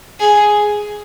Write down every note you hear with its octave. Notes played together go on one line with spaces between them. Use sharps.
G#4